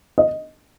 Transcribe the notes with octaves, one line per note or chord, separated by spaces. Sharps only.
D#5